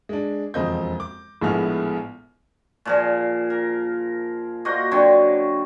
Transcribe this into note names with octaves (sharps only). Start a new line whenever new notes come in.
G#3 D4
E1 F2 C4 D#5 G6
D6
A#1 A2 G#3 B3 F6
A#2 F3 G#4
A#4
A#3 F#4 C5 D#5
D3 F#3 C4 C#5